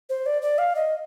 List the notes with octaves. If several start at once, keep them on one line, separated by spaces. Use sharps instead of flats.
C5
D5
D5
F5
D#5